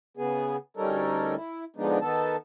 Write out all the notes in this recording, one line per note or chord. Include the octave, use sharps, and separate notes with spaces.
C#3 B3 G#4
D2 G3 C#4 D#4 A4 A#4
E4
D3 F3 G#3 B3 D4 D#4
D#3 B3 A4 A5